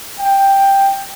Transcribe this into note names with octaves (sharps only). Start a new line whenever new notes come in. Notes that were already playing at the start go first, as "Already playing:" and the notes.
G5